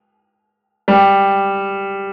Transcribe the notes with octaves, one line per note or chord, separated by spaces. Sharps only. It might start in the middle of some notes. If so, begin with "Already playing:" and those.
G3